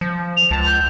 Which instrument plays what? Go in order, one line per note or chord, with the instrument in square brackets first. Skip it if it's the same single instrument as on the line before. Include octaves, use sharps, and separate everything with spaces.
[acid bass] F3
[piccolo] F7
[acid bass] C#2 [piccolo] A5
[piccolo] G6